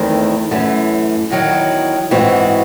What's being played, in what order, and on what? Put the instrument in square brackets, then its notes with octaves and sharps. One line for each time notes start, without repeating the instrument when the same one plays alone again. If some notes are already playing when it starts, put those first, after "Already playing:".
Already playing: [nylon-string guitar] E2 D#3 A3 C4
F#2 E3 A3
E2 D#3 F#3
G#2 E3 C4 F#4